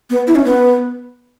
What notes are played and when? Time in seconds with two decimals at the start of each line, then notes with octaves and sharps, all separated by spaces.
0.10 B3
0.27 E4
0.35 C#4
0.45 B3